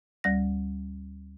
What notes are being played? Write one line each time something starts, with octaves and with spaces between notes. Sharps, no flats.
D2 G3 A#6